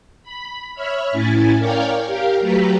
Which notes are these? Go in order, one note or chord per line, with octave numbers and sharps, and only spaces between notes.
B5
C#5 E5 B5 F6
A2 C#4 E4 G#5 A6
A#4 C#5 D5 F5 G5 G#5
G4 A#4 F5
F#3 A3 G4 B4 A#5 B6